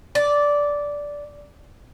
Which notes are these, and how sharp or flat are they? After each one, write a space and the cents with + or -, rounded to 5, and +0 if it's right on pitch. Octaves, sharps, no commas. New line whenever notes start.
D5 -10